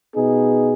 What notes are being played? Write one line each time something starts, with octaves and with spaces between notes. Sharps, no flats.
B2 B3 D#4 G#4